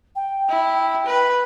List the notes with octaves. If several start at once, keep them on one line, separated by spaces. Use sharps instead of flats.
G5
E4
B4